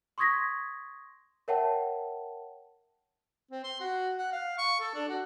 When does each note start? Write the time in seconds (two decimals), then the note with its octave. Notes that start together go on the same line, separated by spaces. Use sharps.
0.18 C6 C#6 D#6 G#6 A#6 B6
1.48 A#4 C#5 E5 F#5 G5 A5
3.51 C4
3.64 C6
3.80 F#4
4.19 F#5
4.32 F5
4.58 C#6
4.80 A4
4.95 D4
5.09 F#4